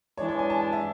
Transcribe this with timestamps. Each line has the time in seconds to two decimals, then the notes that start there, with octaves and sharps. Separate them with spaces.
0.18 E3 G#3 D4 C#5
0.28 C#5
0.39 G#5
0.50 A5
0.61 G#5
0.72 E5